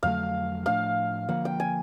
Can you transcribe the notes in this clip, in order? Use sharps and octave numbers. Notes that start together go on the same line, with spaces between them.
F2 D3 F#3 A3 F5
A2 F3 A3 D4 F5
D3 F3 A#3 F#5
G5
G#5